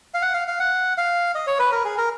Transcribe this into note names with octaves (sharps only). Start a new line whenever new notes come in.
F5
F#5
F5
F5
F#5
F5
D#5
C#5
B4
A#4
G#4
A#4